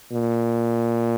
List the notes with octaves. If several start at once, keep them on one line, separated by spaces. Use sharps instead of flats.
A#2